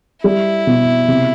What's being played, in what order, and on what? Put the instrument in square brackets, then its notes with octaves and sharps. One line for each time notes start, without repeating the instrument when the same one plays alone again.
[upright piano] G3 [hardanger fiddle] E4
[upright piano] B2
C3